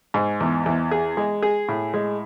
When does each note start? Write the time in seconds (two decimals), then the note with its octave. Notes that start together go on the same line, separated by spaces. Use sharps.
0.14 G#2
0.40 E2
0.66 E2
0.91 G#4
1.17 G#3
1.42 G#4
1.68 A2
1.94 G#3